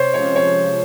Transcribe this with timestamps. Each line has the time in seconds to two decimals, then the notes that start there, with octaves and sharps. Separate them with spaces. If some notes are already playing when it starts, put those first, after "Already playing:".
Already playing: C3 C5 C#5
0.14 F3 G#3 C#4 C#5
0.36 C#5
0.57 C3